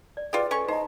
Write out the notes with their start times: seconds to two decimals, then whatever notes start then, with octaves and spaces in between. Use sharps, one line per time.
0.17 D5
0.33 F4 G4 G#4 B4 C5 D5
0.51 C#4 A4 D#5 C#6
0.68 D#4 C5 D#5 A#5